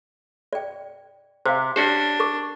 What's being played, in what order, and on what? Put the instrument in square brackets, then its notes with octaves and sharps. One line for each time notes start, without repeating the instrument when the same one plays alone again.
[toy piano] D5 G5
[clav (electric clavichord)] C3 [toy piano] C5 F5
[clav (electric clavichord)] C#4 F#4 C5 [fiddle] D4 [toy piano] G4 D5
[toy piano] A#4 C#6 D6